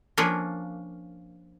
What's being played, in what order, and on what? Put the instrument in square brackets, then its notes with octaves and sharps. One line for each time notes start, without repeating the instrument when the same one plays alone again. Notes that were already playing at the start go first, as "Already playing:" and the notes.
[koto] F3 A#3 C#4 D4